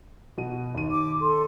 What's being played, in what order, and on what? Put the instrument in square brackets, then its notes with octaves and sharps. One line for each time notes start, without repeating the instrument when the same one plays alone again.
[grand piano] B2 F#4 D#7
D#2 D#3 D#7
[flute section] D6
A4 C6